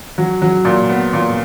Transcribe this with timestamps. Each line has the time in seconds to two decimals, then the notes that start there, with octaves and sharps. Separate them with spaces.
0.18 F#3
0.42 F#3
0.65 A#2
0.89 B3
1.13 A#2